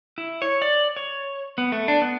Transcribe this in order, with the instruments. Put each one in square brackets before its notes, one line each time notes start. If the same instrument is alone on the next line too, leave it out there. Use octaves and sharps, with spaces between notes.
[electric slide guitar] E4
C#5
D5
C#5
B3
A3
D4
B3